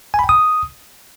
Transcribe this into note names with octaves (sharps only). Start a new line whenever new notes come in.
G#5
B5
G5
D#6